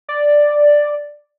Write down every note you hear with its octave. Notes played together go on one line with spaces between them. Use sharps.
D5